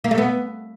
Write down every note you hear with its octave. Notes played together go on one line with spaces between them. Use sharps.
A#3
A3
B3